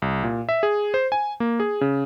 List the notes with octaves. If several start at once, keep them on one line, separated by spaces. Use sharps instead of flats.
C2
A#2
E5
G#4
C5
G#5
A#3
G#4
C#3